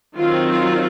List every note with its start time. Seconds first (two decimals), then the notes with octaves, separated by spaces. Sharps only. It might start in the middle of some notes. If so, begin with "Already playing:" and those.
0.16 D#3 F#3 C4 F4
0.49 F4